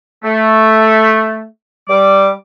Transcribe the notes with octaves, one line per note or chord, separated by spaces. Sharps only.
A3
G3 D6